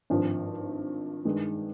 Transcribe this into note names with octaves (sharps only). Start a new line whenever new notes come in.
G#1 G2 F3
G2 D#3 G#3